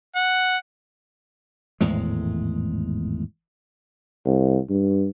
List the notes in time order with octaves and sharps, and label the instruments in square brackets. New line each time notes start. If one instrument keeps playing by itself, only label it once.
[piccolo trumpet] F#5
[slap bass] G#1 E2 A2 G#3
[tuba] C2
G2